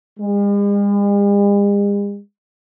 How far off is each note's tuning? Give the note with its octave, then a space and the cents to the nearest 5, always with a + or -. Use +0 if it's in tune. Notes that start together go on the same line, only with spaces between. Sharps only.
G#3 -45